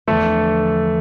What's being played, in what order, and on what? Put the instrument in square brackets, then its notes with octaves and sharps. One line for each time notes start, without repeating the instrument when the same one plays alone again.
[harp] E2 D3 F3 [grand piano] A3 A4